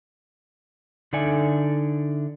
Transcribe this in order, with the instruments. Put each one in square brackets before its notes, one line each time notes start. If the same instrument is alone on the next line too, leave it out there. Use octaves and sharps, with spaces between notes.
[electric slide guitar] D3 D#4 A4 D5 E5 G#5